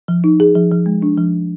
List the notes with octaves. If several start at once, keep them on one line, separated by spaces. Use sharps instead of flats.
F3
D#4
G#4
F3
F3
G#3
D4
F3